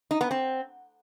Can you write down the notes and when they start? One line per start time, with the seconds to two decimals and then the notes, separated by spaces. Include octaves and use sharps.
0.11 D#4
0.21 B3
0.31 C4